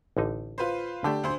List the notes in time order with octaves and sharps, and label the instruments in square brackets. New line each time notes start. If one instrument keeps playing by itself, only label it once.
[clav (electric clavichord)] A1 D3 D#4
[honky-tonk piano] F4 B4 C5
[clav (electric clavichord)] D3 A3 [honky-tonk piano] D4 G4
[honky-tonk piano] D2 C5